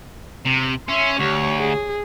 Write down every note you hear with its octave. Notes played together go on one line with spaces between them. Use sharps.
C3
C#4 E5 C6
D2 G4 C#5
G#4